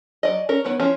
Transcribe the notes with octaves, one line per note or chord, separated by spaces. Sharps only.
F#3 D5 D#5
C#4 A#4
D#3 B3 B4 C#5
F3 C#4 E4